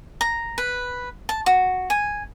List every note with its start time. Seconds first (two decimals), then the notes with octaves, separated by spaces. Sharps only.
0.21 A#5
0.58 B4
1.29 A5
1.46 F#4
1.90 G#5